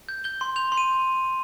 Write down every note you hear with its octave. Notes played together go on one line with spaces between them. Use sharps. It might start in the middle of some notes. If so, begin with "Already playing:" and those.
G6
G6 G7
C6
G6 F7
C6
D#7